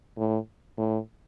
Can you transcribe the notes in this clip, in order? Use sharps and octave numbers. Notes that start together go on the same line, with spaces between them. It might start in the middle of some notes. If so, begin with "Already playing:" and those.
A2
A2